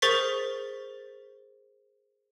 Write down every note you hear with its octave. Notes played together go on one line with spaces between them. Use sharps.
G#4 A#4 C5 C#6 A6 B6